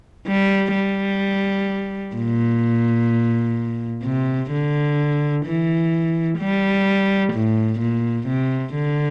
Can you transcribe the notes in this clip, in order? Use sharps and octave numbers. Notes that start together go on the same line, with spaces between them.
G3
G3
A#2
C3
D3
E3
G3
A2
A#2
C3
D3